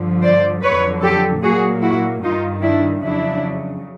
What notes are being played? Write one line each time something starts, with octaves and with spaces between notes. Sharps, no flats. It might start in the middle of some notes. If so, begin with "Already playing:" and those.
Already playing: G2 D3 F3
C5 D5
F2 D3 F#3 B4 C#5
G4 A4
A#2 F#3 A#3 F#4 G#4
E4 F#4
G2 D#3 G3 D#4 F4
D4 E4
F2 C#3 F#3 D4 E4